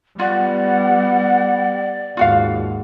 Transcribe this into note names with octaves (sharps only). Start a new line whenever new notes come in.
G3 B3 F4 D5 F#5
D#2 G#2 F4 F#4 F5